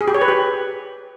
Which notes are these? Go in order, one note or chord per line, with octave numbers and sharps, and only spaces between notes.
G#4
G4
C#5
B4
G4